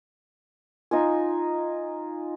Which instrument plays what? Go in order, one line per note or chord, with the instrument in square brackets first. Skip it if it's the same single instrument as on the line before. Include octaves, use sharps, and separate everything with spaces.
[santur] D#4 F4 G#5